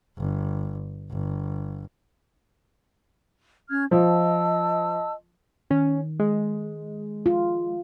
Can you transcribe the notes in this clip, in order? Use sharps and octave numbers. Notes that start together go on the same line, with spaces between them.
G1
G1
C#4 F6 G#6
F3 D#5 A5 E6
D#3 C#4
G#3
F4